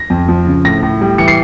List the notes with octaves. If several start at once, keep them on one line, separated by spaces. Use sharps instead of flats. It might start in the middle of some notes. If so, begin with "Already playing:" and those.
Already playing: A#6
F2
F3
C#3
A2 A#6
A2
G3
E3 C#7
C7